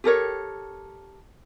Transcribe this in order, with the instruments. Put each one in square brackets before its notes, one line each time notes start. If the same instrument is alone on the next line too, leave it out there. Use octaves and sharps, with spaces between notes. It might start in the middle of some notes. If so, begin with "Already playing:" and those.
[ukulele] G4 A4 A#4 C#5